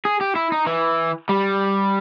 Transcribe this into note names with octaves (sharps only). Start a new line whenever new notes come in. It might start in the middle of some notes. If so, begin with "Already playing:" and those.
G#4
G4
E4
D#4
E3
G3